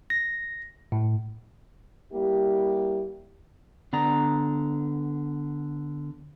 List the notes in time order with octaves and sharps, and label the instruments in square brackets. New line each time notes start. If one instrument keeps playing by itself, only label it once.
[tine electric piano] A#6
A2
[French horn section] G3 A#3 E4 G4
[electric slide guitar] D3 B3 D5 A#5